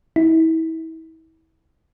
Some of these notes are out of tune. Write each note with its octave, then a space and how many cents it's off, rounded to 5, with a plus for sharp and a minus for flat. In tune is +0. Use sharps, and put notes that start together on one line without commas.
E4 -35